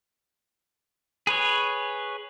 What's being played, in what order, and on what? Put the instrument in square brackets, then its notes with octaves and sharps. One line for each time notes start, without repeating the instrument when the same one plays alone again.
[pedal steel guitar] G#4 B4 C#5